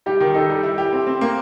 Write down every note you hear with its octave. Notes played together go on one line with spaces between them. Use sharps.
G3 G4
D#3
D#4 A4
G3
E4
G4
C4
C4
A#3